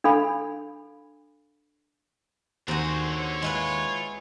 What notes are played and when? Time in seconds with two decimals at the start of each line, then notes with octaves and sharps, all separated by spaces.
0.04 D4 A4 F5 B5
2.68 D#2 D3 C4 F#4 C5 G#5 A#5
3.10 D3 C#5
3.42 G#3 E4 F4 B4